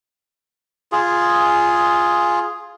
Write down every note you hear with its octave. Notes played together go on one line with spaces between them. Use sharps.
F4 G#4